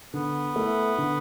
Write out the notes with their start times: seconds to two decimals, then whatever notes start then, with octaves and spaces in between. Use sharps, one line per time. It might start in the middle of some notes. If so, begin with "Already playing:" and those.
0.14 D3 B3
0.56 A3 E4
0.98 D3